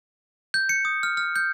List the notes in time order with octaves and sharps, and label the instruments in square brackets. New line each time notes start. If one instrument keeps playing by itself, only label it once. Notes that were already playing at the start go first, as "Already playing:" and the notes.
[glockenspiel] G6
C#7
D#6
F6
F6
G6